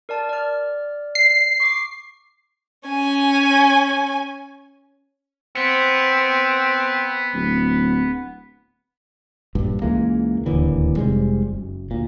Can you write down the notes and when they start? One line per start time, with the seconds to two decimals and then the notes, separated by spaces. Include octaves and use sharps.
0.09 A#4 D5 A5
0.29 D5 F6
1.15 C7
1.60 C#6 D6
2.88 C#4 G#5
5.57 B3 C4
7.33 D1
9.55 A#1 G2
9.82 C#2 E3 G#3 A#3
10.46 D1 D#2 D3 E3
10.97 F1 C3 G3 G#3
11.53 F#1
11.91 D2 A#2